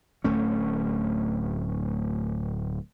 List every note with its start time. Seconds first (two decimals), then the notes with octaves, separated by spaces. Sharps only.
0.24 D1 A3 C#4